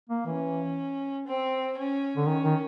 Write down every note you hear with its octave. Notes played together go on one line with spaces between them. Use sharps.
A#3
E3 C#4
C4
C#4
D3
D#3 C#4
D#3